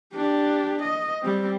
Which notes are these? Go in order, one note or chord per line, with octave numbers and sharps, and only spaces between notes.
D4 G4
D#5
G3 C4